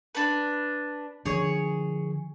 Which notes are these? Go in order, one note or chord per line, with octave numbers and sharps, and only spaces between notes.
D4 B4
D3 F3 D4 G#4 C#5